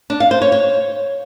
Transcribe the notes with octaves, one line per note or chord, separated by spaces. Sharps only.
D4
F5
C5
C#5
C#5